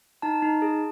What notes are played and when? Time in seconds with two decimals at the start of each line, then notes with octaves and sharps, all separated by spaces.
0.22 D#4 A5
0.42 D#4
0.62 G#4